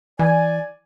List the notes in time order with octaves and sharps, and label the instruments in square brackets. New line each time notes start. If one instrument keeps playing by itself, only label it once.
[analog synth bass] E3 [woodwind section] D5 G#5